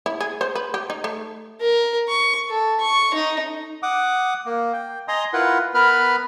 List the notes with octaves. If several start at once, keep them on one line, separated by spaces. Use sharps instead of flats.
E4
G#4
C5
B4
G4
D#4
A3
A#4
C#6
A4
C#6
D#4
F#5 D6 D#6
A#3
G5
D#5 G#5 A#5 C6 D#6
E4 F4 A#4 B4 F#5
B3 A#4 B4 B5 F6